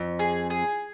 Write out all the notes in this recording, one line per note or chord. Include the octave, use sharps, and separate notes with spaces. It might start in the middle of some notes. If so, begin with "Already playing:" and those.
Already playing: F2
G#4
G#4